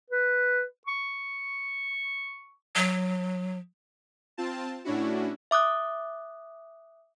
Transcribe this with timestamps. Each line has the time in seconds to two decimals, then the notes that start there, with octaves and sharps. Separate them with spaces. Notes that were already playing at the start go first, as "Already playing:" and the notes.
0.10 B4
0.87 C#6
2.76 F#3
4.38 C4 F4 A5
4.85 A2 C#4 D4 E4 F#4
5.51 E5 D6 D#6 F#6